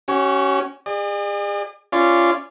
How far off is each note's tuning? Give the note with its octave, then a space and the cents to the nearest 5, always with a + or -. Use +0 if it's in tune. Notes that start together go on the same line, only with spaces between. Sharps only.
C#4 +0 F#4 +45
G#4 -40 D5 +45
C#4 +0 F4 -20 D5 +0